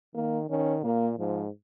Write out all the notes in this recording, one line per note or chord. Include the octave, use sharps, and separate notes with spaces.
D#3 A#3
D#3 C#4
A#2 A#3
G#2 F3